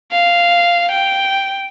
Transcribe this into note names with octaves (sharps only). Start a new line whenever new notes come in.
F5
G5